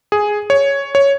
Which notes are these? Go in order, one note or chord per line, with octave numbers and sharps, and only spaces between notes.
G#4
C#5
C#5